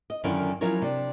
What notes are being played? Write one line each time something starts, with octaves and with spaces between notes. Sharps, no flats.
D#5
F#2 D3 D#3 C#4 E4 F4
F3 F#3 C#4 E4 A#4 C#5
C3 D4